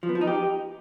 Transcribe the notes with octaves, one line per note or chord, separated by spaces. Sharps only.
F3
B3
F3
D#4
G4